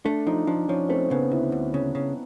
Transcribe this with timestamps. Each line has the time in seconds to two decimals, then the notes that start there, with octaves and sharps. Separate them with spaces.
0.05 A3 D4
0.27 F3 D#4
0.47 F3 D4
0.68 F3 C#4
0.89 A3 C4
1.10 C#3 B3
1.32 D2 E4
1.52 D2
1.74 C#3
1.95 C#3